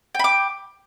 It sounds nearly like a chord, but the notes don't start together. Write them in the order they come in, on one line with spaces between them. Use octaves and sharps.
G5 B5 D6